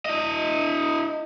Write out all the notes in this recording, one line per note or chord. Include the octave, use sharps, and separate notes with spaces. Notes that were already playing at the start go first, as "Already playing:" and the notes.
E4 D#5